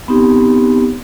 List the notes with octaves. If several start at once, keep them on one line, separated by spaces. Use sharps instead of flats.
B3 C4 D#4 G4